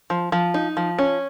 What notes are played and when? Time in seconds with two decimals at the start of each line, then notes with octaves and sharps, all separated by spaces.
0.10 F3
0.32 F3
0.54 D#4
0.77 F3
0.99 C#4